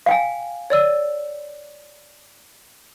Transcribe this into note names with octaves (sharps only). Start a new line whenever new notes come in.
F5 G5 G#5
C#5 D5 E6